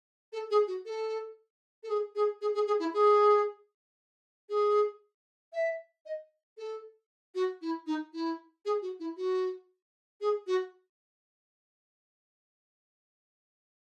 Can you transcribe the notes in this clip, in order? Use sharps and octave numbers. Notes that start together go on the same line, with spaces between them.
A4
G#4
F#4
A4
A4
G#4
G#4
G#4
G#4
G#4
E4
G#4
G#4
E5
D#5
A4
F#4
E4
D#4
E4
G#4
F#4
E4
F#4
G#4
F#4